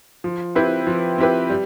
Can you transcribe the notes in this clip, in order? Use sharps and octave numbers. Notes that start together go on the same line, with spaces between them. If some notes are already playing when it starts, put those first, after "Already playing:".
F3
C4 E4 G4 B4
F3
C4 E4 G4 B4
G3